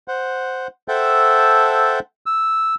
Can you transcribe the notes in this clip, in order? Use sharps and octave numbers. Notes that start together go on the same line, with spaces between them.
C5 F#5
A4 C5 E5 F#5 G5 A5
E6